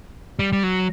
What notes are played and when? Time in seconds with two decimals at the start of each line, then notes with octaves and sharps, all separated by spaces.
0.39 G3
0.53 G3
0.63 F#3